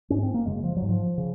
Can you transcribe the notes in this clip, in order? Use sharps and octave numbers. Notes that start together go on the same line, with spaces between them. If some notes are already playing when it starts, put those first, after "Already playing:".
G#2 C#4
C4
A#3
F#2 C#3 G#3
F3
F#3
G#2
F3
C#3